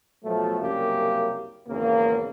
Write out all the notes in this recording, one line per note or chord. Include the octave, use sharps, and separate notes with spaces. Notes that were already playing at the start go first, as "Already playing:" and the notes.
B2 F3 F#3 A3
C2 F#2 C#3 A#3 G4
G#1 E2 C#3 A#3